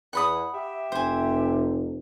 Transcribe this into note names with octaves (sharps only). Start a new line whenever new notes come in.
E2 F#5 B5 D#6
G4 E5
F1 C5 G#5